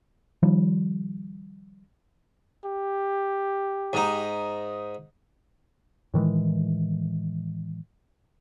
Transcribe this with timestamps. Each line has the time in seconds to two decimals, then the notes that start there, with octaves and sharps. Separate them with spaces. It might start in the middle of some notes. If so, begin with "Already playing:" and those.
0.43 D#3 F3 G3
2.65 G4
3.93 G#2 D#4
6.14 A2 D#3 E3 G#3